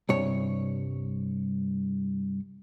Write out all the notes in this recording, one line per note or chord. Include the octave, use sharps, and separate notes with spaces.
C2 G2 C#5